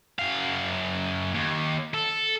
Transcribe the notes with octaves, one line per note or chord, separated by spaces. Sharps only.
F#2 F5
D#2
A4